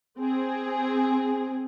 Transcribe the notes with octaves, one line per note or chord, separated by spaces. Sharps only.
C4 G#4